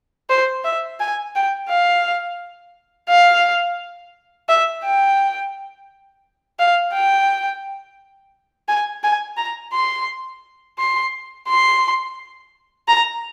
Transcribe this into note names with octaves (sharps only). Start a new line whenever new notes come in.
C5
E5
G#5
G5
F5
F5
E5
G5
F5
G5
G#5
G#5
A#5
C6
C6
C6
A#5